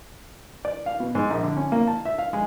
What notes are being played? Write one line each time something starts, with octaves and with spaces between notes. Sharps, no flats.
D5
F5
B2
G#2
A#1
D3
C#4
A#3
A5
E5
F5
G#3